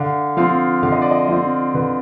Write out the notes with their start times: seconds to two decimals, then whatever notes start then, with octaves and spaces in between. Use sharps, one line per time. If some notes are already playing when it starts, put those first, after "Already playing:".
Already playing: D3 F5
0.37 F3 C4 F5
0.83 D3 F5
0.92 D#5
1.02 D5
1.11 D#5
1.28 F3 C4 D#5
1.74 D3 B4